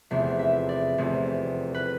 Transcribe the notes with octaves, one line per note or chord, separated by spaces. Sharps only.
F1 E2 C3 E5
E5
D5
F1 E2 C3
B4